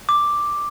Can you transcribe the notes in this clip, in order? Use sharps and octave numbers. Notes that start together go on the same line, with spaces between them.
D6